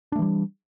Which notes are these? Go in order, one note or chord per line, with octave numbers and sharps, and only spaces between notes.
E3 G3 A3 D4